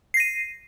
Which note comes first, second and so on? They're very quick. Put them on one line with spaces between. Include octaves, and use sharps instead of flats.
C7 A#6 D#7